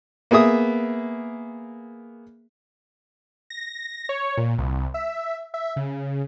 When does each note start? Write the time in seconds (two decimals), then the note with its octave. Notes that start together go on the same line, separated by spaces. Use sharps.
0.31 A#3 B3 G#4 E5 D#6
3.50 A#6
4.09 C#5
4.37 A#2
4.58 C2
4.94 E5
5.54 E5
5.76 C#3